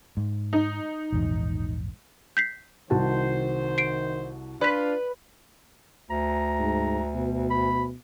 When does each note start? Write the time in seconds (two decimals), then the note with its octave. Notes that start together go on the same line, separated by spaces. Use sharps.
0.17 G#2
0.53 D#4
1.12 A#1 E2 G#2
2.37 G6 B6 C7
2.90 C2 D#3 F#4 C5 A5
3.78 C7 D7
4.61 D4 F4 B4 D5 B6
6.10 D2 A#5
6.60 G#2
7.14 B2
7.50 B5